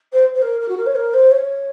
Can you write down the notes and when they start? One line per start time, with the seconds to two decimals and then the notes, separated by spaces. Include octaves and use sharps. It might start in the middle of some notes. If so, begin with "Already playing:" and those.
0.12 C5
0.34 C5
0.42 A#4
0.60 A#4
0.68 F#4
0.77 A#4
0.86 C#5
0.95 A#4
1.13 C5
1.31 C#5